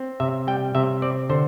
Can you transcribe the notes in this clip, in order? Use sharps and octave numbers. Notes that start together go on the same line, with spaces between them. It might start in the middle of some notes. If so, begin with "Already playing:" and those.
Already playing: C4
C3 E5
G3 G5
C3 E5
C4 D5
D3 C5